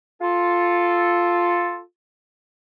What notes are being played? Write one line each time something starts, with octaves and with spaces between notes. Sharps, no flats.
F4 A4